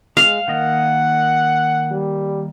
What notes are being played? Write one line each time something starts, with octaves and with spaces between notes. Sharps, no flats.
G#3 F5
D#3 A#3 D#5 F#5
G3